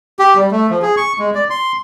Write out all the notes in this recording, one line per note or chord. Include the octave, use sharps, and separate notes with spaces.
G4
G3
A3
F3
G#4
C#6
G#3
D5
C6